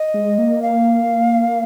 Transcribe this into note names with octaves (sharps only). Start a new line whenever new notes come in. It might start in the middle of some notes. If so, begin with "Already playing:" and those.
Already playing: D#5
G#3
A#3
F5